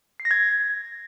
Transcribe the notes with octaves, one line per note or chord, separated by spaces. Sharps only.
C7
A#6
G#6